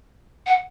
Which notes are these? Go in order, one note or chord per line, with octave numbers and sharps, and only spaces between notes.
F#5